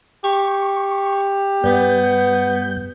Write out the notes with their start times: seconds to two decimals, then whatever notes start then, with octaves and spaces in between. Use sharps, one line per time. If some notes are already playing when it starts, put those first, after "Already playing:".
0.24 G4 C#6
1.64 G2 G3 B3 G6